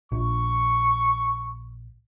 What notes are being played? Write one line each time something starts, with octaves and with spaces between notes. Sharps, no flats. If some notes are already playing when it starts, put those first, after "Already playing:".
A#1 C#6